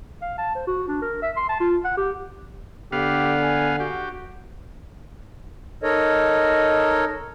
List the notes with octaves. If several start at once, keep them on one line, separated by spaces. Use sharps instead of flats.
F5
A5
C5
F#4
D4
A#4
E5
C6
A5
F4
F#5
G4
D3 B3 G4 F5
G#5
F#4 G4
D#4 A4 A#4 C#5 D#5